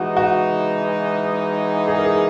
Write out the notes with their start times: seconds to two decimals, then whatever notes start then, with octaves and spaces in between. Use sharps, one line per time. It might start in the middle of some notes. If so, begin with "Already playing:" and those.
Already playing: E3 G#3 D#4 F#4
0.17 F#4
1.88 G#4
1.99 A#4
2.04 G#4